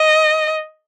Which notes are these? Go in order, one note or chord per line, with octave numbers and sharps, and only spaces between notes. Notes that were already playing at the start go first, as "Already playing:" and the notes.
Already playing: D#5